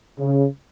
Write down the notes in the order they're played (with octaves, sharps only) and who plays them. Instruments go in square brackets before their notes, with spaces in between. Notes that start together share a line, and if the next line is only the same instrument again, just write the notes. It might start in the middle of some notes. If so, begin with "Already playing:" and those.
[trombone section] C#3